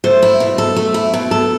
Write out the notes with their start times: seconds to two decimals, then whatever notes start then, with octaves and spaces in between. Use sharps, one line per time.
0.04 A3 C5
0.22 E4
0.40 B2
0.58 A4
0.76 A3
0.94 E4
1.14 B2
1.31 A4